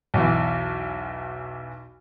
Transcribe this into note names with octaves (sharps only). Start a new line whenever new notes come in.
B1 E2 E3